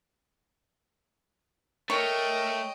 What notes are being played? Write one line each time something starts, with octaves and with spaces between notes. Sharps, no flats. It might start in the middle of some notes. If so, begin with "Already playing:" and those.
A3 A#4 C#5 D#5 G5